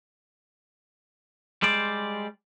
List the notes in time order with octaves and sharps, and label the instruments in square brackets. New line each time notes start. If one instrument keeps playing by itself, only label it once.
[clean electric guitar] G3 G#3 C5 D5